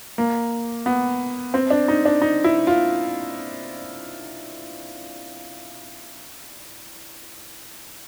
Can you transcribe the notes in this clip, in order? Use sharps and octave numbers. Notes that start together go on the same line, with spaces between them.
A#3
B3
C4
D4
D#4
D4
D#4
E4
F4